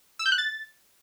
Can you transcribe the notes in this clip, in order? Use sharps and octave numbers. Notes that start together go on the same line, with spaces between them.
E6
G6
F#6
A6